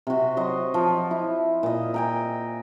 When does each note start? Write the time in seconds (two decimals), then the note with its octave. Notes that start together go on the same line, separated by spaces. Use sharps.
0.07 C3 F#4
0.37 F#3 D#5 C6
0.74 F3
1.11 E4
1.63 A#2 D#5
1.94 A#4 G5 G#5